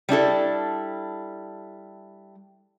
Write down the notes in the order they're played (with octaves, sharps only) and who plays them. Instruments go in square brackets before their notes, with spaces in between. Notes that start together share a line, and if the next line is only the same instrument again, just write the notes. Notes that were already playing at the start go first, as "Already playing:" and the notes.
[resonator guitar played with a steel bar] G3 D4 E4 A4